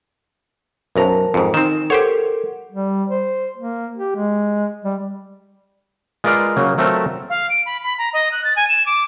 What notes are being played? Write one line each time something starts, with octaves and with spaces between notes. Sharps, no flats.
B1 F#2 A#4 C5 A5 A#5
F2 G#2
D#3 C4 D#4 E7
G4 A4 A#4 C5 C#5 F#5
G3
C5
A#3
G4
G#3
G3
G#3 F4 A#4 B4 D5 F5
C#3 F#3 A#3
F#3 A3 C4 F4 A4 A#4
F5
D7
B5
B5
A#5
D#5
F#6
A6
G#5
E7
D6